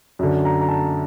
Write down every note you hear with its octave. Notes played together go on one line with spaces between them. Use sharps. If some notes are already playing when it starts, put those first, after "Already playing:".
F#2 D3
A#5
A#5
A5